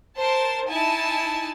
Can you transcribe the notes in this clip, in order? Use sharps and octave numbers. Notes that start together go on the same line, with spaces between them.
A#4 C5 A5
D#4 E4 G#5 A5